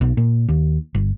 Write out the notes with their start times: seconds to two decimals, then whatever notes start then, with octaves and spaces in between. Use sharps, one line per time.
0.01 B1
0.17 A#2
0.49 D#2
0.95 G1